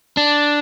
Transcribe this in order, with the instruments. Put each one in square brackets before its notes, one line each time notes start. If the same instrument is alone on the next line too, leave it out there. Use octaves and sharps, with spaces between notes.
[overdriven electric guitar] D4